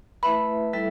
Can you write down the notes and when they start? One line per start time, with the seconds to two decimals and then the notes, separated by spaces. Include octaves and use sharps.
0.23 A3 E4 B4 E5 B5
0.73 G3 E4 A4 E5